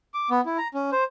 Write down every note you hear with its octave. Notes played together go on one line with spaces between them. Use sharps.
D6
B3
E4
A#5
C#4
C5